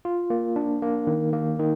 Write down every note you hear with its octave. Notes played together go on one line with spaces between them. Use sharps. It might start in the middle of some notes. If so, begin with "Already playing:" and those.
F4
A#3
D4
A#3
D#3
A#3
D#3